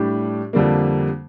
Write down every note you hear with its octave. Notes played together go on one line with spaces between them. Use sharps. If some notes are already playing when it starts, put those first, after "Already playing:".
Already playing: A2 G3 D4 G4
F2 D3 G3 A#3